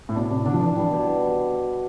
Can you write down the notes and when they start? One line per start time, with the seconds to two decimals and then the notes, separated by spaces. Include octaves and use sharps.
0.09 A2
0.15 B2 D4
0.30 C3 D4
0.45 D3 D4
0.53 F3
0.61 E3 D4
0.76 E3 G3
0.91 B2